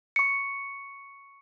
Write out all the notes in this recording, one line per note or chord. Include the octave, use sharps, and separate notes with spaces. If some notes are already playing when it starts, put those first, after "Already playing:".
C#6 C#7